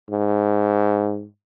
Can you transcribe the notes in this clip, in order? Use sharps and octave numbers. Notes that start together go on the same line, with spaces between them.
G#2